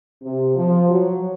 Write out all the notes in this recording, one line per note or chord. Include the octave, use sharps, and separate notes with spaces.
C3
F3
F#3